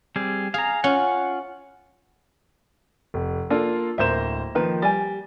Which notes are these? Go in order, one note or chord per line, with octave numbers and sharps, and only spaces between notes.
G3 C4 G#4
G#4 F5 A#5
C#4 F4 F#5
F1
A#3 D4 F4 A4
D1 A#3 C5 E5 E7
D#3 F3 A#3 D#4 B4
G3 G#5 A6